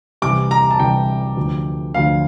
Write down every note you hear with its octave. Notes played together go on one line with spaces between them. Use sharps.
C2 C3 E3 D6
A#5
A5
C2 C3 E3 G5
D2 D3 F3
D2 D3 F3 F5